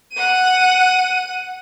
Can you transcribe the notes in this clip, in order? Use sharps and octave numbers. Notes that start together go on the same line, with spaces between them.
F#5 D#7